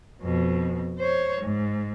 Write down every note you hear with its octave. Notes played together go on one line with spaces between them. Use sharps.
F2 B2
C5 C#5
G#2